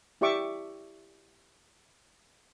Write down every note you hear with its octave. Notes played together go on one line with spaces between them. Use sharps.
E4 G4 D5 E5 C#6 D6